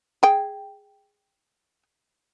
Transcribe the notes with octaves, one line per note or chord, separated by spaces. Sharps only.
G#4 G5